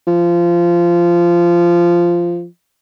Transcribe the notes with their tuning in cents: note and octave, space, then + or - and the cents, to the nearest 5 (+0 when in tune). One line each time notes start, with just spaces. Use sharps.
F3 -15